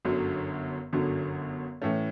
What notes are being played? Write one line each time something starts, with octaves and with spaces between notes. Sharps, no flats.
G1 F#2 D3 F#3
G1 F#2 D3 F#3
A2 E3 A3 C#4